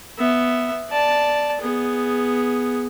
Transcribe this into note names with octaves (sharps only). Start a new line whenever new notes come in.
B3 E5
D5 A5
B3 G#4